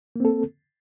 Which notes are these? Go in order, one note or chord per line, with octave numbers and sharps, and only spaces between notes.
A#3 C4 A4